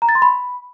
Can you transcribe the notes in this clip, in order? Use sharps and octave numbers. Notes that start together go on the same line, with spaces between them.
A#5
A6
C6
B5